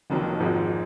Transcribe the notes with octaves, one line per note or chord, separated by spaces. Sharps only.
F1 F2 D#3 F#3 A#3
G#1 G#2 F3 G#3